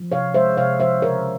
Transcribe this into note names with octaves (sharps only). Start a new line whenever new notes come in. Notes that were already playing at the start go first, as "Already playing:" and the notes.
Already playing: F3
C3 C#5 F5
G#3 C5 E5
C3 C#5 F5
F3 C5 E5
C#3 A#4 C#5